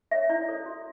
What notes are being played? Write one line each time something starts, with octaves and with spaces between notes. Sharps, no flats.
A4 C#5 E5
E4 D5
A4 C#5
F#4